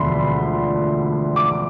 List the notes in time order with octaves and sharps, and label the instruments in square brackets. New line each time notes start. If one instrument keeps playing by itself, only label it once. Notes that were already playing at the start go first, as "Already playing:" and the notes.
Already playing: [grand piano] E1 D2 D3 F3 B5 C6
D6